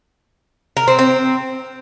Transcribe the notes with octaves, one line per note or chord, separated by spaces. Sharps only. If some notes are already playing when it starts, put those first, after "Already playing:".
A#4
C4
C4